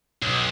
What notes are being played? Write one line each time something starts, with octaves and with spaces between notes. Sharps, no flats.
B1